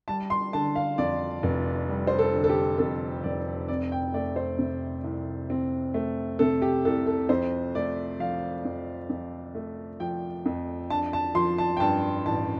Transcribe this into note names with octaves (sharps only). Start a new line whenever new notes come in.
G3 A5
C6
D3 A5
F5
F2 D5
F1
G3
C5
A4
D3
A4
G4
F2 A4
F1 D5
C4 D5
G5
A3 D5
C5
C3
C2
C4
A3
C3 A4
G4
C2 A4
A4
F2 C5
A3 D5
F3 F5
F2
F2
A3
F3 G5
F2
D4 A5
A5
F3 C6
A5
G5
G2 A5
A1 A5